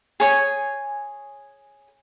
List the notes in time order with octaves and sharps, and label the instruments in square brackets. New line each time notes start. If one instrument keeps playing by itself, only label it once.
[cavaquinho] G#4 C#5 G#5